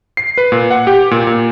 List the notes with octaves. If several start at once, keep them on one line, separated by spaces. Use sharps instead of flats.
C7
B4
A#2
F#5
G4
A#2
A#2